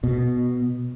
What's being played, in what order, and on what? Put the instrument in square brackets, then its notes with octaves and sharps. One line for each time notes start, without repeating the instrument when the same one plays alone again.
[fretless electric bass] B2